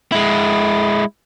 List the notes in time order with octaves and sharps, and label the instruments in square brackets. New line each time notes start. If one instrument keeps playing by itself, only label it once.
[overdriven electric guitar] G#3 E4